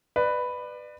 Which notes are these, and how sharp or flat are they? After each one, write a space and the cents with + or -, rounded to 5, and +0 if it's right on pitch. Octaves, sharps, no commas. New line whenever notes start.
B4 +5 D5 +30